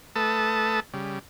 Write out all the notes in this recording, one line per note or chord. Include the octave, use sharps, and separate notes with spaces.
A3 A4 B4 A5 D#6
C#3 G3